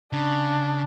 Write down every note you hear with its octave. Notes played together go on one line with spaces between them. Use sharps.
C#3 D4